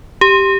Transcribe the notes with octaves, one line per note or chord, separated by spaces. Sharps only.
G4